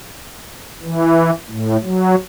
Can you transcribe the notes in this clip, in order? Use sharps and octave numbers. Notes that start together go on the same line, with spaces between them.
E3
A2
F#3